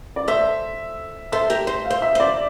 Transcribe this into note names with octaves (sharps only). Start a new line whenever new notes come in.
D5
A4 C5 E5
A4 C5 E5
G4 A#4
C5
F5
C5
E5
C5 D5